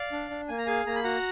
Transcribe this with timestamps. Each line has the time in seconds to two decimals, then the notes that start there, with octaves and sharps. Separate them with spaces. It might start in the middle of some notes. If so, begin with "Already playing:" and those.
Already playing: D5 F5
0.12 D4
0.30 D4
0.48 A#3 G#5
0.58 A#5
0.66 G#4 F5 G#5
0.86 A#3 A#5
0.95 B5
1.03 F#4 F#5 A#5